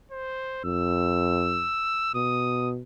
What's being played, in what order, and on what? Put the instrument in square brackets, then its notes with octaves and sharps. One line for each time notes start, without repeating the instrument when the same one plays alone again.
[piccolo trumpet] C5
[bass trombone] F2 [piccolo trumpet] E6
[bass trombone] B2 [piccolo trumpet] D#6